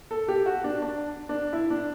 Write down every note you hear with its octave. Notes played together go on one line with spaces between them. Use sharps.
A4
G4
F#4
D4
D4
D4
E4
D4